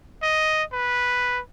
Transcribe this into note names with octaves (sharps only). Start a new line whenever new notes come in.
D#5
B4